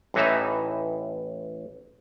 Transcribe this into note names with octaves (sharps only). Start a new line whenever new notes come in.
A1 A2 E3 D#4 E5